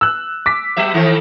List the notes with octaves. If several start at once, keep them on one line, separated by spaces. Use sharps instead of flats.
E6 F#6
D6 B6
F#3 B3 E5
D#3 A3 C4